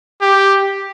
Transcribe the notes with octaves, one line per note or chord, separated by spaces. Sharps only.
G4